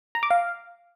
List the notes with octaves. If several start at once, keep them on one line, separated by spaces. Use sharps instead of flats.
A#5
D6
F5